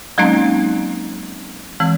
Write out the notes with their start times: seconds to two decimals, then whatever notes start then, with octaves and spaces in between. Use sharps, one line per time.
0.18 F#3 G#3 A#3 C4 C#4 D#4
1.80 E3 G#3 C4